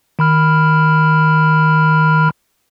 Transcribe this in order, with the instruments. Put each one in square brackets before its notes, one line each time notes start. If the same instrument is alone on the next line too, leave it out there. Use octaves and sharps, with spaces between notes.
[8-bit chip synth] D#3 B5 F6